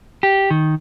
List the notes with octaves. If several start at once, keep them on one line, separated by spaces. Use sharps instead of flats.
G4
D#3